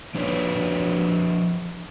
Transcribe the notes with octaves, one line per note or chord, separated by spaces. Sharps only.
F3 D4 B4 C#5